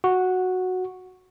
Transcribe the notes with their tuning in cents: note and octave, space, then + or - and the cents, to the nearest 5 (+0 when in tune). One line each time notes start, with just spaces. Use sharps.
F#4 -5